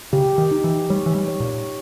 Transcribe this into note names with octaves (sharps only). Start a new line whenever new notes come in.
C#3 G4
D#3
D#4
E3
G3 C#5
E3
G3
C#5
A#2